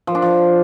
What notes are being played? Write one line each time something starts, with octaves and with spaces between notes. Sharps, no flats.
F3
D4
F3